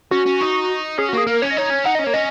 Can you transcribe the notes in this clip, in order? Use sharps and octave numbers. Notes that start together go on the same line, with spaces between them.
C#4 F#4
C#4
D#4
C#4 G#4
F#4
A#3 G#4
A#3 A#4
C#4 C#5
D#5
D#4 C#5
C#4
D#4 F#5
C#4 D#5
A#3 C#5
C#4 D#5